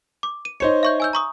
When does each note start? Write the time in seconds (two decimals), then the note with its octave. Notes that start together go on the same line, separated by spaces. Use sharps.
0.23 D6
0.45 D#7
0.60 D#4 C5 C#5 C#7
0.83 E5 C#6 G6
1.00 G#5 E6 G6
1.13 A#5 C#6 D#6